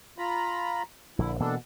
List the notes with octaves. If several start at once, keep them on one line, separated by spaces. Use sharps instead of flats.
F4 A#5 B5
A#1 D3 E4
B2 E3 A#3 D4 A4